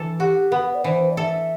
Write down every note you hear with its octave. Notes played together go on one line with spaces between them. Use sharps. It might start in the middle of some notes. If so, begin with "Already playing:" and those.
Already playing: E3 A4
F#4 G4
B3 B4
D5
E3 C5
D5
A4 E5